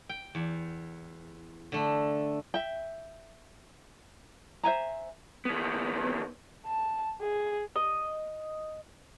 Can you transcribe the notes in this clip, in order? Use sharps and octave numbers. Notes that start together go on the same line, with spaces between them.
G5
E2
D3 A3
E5 G5
C5 E5 G#5 A#5
D#2 B3
A5
G#4
D#5